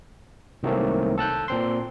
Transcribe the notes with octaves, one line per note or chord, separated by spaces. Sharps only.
C2 D#3 F#3 A3 A#3 C4
A4 A5 F#6 G6
A#2 C4 C6